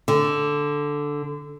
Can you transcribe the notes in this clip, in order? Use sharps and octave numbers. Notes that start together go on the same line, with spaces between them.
D3